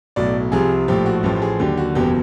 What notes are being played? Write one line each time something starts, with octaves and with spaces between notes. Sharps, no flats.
B1 A2 F#3 D5
C2 C3 F3 G#4
A#1 A2 F3 G4
F#4
A1 A2 F3 G4
G4
G#4
D#2 D3 F#3 G4
F#4
F#1 E2 B2 F#3 G4